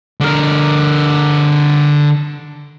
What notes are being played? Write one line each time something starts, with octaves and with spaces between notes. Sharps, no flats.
D3 A#4